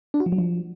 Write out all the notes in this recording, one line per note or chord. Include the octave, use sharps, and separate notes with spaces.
D4
F#4
F3
F#3
F3